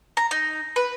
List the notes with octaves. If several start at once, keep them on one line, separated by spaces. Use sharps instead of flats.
A#5
D#4
B4